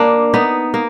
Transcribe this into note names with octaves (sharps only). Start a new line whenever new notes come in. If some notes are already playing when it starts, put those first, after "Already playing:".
Already playing: A#3 D4
B3 D#4
A#3